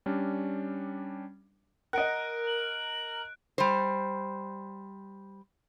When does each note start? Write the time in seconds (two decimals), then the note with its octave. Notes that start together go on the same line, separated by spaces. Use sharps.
0.06 G3 C#4 D4
1.93 A#4 D#5 F#5 F#6 D7
2.47 F#7
3.58 G3 C5